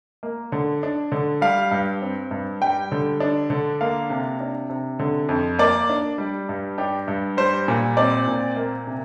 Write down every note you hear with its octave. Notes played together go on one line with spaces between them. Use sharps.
A#3
D3
D4
D3
G3 F5
G2
C4
G2
G3 G5
D3
D4
D3
A#3 F5
C3
D4
C3
D3
F2
A#3 D5
D4
G3
G2
D4 G4
G2
G3 C5
A#2
C4 D5
A#2
A#3
C3